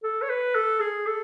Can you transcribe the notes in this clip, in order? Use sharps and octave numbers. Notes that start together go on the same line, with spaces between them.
A4
C#5
B4
A4
G#4
A4